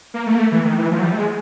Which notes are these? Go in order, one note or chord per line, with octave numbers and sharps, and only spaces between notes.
A#3
A3
A#3
A3
E3
D#3
E3
F3
F#3
G3
A3
G#3